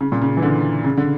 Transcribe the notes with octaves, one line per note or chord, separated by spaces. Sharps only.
C#3
A#2
C#3
E3
D3
C#3
D3